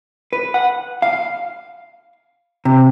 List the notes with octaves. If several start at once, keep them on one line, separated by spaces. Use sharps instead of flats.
B4
F#5
F5
C3